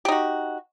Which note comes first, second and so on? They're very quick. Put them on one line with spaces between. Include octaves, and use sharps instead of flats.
G4 D#4 F#4